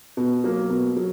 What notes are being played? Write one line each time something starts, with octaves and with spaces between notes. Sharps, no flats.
B2
F#3 A#3
B2
F#3